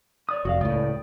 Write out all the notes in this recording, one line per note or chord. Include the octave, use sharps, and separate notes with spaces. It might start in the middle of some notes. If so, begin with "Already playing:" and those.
C#5 D5 D#6
F1 F#4 D5 F5
C#2 A2 D5 G5 D#6